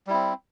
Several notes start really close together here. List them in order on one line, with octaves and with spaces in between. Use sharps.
G3 E4 C4